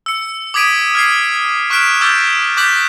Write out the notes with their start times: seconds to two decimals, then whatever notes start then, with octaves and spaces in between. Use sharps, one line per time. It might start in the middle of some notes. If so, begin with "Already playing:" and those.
0.06 E6 C#7
0.54 D6 D#6 G#6 B6 D7 D#7
0.95 F6 G#6 C7
1.70 C#6 F6 F#6 B6 D7 E7
2.01 D6 E6 F6 G6 A6
2.57 D6 F#6 G6 A6 B6 F#7